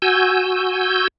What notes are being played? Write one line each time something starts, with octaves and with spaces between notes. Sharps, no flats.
F#4 G#5 E6 G6